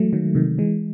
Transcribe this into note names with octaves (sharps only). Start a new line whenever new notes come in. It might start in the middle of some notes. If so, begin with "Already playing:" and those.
Already playing: E3 F#3 G#3 A3
D#3 F#3
C3 D#3
E3 G#3